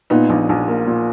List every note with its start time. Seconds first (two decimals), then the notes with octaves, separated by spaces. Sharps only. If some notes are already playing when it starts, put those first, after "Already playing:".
0.10 A#2 B3 D#4
0.29 A#1
0.49 A#1
0.68 A#3
0.87 A#2